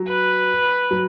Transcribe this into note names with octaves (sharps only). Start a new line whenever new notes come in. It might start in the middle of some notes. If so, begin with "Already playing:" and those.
Already playing: F#3
B4
F#3